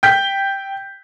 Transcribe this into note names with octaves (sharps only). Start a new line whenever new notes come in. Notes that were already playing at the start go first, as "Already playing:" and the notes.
G5 G6 B6 G7